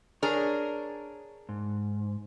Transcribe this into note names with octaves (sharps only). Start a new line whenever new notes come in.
D4 G#4 A#4 C#5 A#5
G#2